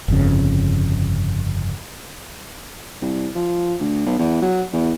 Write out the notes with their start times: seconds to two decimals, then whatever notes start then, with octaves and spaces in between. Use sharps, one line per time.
0.08 G1 F2 C#3
3.02 C2
3.35 F3
3.80 D2
4.06 B1
4.19 E2
4.42 F#3
4.73 E2